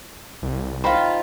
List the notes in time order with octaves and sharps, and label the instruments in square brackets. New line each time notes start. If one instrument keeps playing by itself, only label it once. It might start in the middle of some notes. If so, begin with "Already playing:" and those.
[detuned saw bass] C2
[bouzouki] D#3 F4 [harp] C5 B5